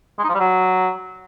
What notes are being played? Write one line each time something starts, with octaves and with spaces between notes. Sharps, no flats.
G#3
D#4
F3
G3
F#3